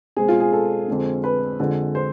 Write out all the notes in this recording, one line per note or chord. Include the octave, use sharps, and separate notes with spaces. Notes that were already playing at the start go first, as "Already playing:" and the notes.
B2 G#3 C4 G#4
F4
G#4
A4
F2 D3 G#3 C4
B4
F2 D3 G#3
C5